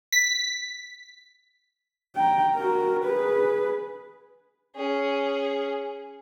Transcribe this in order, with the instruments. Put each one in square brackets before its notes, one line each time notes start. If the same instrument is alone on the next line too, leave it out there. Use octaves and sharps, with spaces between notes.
[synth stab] B6
[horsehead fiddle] G5 A#5
F#4 A#4
G#4 B4
[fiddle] C#4 G#4